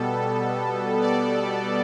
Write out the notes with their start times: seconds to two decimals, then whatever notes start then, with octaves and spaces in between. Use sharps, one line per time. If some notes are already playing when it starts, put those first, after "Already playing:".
Already playing: B2 G3 B3 A4
1.01 D5